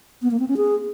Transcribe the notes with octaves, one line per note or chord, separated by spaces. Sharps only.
B3
A#3
C4
C#4
G#4